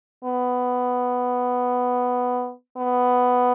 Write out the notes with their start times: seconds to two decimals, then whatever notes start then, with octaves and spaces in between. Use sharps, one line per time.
0.24 B3
2.77 B3